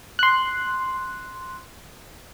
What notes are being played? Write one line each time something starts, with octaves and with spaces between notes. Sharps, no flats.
C6 F#6